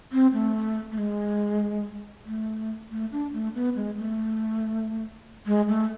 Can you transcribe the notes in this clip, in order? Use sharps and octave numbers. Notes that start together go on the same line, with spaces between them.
C4
A3
A3
G#3
A3
A3
D4
A3
B3
G#3
A3
G#3
A3